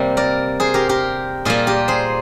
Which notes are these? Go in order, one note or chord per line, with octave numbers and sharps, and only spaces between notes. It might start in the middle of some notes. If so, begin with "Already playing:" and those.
Already playing: C3 G3 A#3
A#4 D5
G#4 C5
G4 A#4
G4 A#4
A#2 G3 A#3 F4 G#4
G4 A#4
G#4 C5